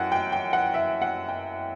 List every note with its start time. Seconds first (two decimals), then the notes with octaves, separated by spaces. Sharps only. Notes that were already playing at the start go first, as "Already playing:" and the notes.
Already playing: F#2 E3 F#5 G5
0.12 G5
0.32 G5
0.53 F#5
0.74 E5
1.02 F#5
1.29 G5